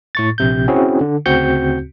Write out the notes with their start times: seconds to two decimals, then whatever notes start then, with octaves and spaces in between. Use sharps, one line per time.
0.15 A2 C#6 A6
0.38 A#1 C3 G6
0.68 C4 C#4 E4 F#4 G#4
1.01 D3
1.26 D2 C#3 C4 F#4 G6 C#7